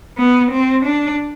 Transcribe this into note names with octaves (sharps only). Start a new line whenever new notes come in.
B3
C4
D4